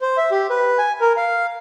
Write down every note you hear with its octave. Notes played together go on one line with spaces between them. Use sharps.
C5
E5
G4
B4
G#5
A#4
F5